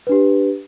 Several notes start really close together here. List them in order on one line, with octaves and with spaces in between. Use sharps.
B4 D4 G4